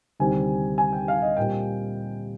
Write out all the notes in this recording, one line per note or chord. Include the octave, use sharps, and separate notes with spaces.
D2 C3 D#3 G3 C4 G#5
G#5
G5
F5
D#5
A#2 G3 C4 G5